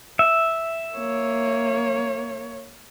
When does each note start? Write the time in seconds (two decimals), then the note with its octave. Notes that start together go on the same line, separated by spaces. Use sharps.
0.19 E5
0.95 A#3 C#5